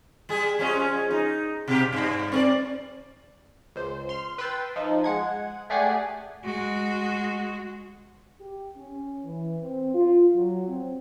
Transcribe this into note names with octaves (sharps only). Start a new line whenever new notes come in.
G3 G#4
F3 G#3 C#4
D#4
B2 G4
G2
C4 A#4 D5
C#2 C5
C6 F6
B4 G5 B5 C6 E6 A6
F3 D#4
G#3 F#5 G#6
A3 G4 G#4 D5 F#5 G#5
G#3 F#4
G4
C#4
E3
C4
F4
F#3
C4